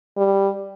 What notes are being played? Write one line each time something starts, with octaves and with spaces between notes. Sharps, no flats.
G3